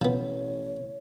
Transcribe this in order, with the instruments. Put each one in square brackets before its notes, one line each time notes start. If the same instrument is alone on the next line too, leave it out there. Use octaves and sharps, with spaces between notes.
[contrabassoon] A1 [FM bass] B2 [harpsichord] F3 B3 [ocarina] C#5